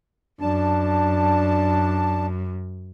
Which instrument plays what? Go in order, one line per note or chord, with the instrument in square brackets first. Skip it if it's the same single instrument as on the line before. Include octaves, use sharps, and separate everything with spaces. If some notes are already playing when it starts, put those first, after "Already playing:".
[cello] F#2 [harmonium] D4 A5